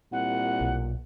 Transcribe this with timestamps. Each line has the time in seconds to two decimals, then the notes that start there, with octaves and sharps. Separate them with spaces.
0.12 C2 A#2 F#5
0.61 B1